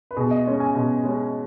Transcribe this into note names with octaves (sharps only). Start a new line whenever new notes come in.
B4
B2 G#4
D#5
G#3 C#4
G#5
B2
G#3 C#4